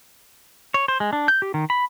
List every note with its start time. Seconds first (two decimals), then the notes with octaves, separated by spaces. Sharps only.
0.74 C#5
0.88 C5
1.00 G#3
1.13 D4
1.28 G6
1.42 G4
1.54 D#3
1.70 B5